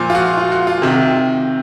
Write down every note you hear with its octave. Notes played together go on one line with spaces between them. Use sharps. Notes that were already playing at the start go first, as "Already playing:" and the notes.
Already playing: A#2 F3
F4
F#4
F4
F#4
F4
C3 D#3